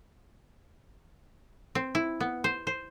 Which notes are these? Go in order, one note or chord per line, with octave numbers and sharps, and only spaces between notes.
C4
E4
B3
C5
C5